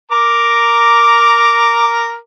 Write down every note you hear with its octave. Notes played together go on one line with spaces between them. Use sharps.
A#4 A#5 D6